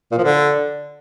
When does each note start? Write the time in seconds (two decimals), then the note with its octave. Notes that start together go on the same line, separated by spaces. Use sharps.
0.12 A#2
0.18 F3
0.24 D3